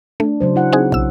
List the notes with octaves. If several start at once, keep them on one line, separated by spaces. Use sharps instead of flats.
A3 D4
C#3 F#3 C5
E4 F#5
C4 D#4 G#4
B1 E6